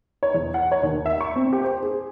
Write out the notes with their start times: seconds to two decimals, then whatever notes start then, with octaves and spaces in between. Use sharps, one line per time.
0.23 C#5
0.34 E2
0.54 F#5
0.72 C#5
0.83 D#2
1.06 E5
1.21 C#6
1.36 C4
1.53 G4
1.64 C5
1.83 G#4